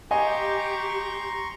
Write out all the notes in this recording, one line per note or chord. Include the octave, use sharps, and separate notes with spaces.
G4 D#5 G#5 A#5 C6 C#6